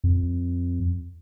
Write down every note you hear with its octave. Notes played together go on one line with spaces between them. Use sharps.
F2